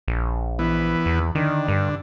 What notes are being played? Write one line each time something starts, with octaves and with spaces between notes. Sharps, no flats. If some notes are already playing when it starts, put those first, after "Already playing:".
A#1
E3 B3
E2
D3 D#3
G2